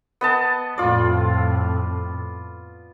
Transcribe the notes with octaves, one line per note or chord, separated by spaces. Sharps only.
B3 D#5 A5
F2 A2 F4 D5